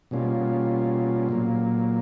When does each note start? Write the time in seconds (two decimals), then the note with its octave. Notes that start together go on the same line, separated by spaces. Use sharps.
0.11 B2 G3 A#3 C#4 F4
1.29 A#2 F#3 A#3